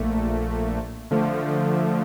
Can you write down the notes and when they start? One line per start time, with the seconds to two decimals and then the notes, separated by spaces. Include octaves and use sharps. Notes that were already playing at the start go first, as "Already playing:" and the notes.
Already playing: A#1 A#2 A3
1.11 D3 F3 A3